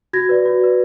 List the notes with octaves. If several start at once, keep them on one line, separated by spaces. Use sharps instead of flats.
F#4 G#6 A#6
B4 D5
F#4
B4 D5